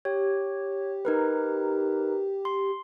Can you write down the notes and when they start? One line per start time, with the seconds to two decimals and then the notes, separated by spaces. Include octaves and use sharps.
0.05 G4 C#5
1.05 D#4 A#4 B4
2.45 C6